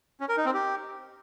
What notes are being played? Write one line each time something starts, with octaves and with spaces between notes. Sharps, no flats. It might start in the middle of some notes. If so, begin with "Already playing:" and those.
C#4
A#4
D#4
C4
G4